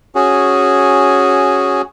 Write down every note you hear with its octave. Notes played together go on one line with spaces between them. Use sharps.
C#4 F#4 G#4